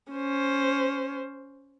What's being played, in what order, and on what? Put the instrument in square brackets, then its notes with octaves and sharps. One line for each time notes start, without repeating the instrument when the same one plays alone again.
[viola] C#4 C5